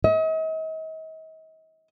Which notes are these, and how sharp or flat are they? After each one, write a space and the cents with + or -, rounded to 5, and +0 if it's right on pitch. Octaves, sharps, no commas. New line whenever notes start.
D#5 +40